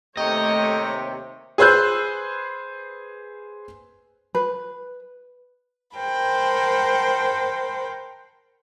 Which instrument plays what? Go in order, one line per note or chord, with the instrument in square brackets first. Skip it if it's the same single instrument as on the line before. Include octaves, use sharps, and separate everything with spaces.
[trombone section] D#2 C3 [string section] A3 C#5 [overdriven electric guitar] D#5 [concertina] G5 A#5
[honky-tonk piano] G#4 B4 C5 E6 F#6 G6
[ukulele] B4
[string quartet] A#4 C5 F#5 G5 A5 B5